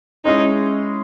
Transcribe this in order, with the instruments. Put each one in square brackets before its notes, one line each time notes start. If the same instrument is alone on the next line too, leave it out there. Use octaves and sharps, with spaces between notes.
[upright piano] G#3 C#4 E4 G#4 [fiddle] D#4